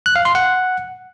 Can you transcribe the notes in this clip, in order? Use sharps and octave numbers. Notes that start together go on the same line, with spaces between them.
F#6
F5
C6
F#5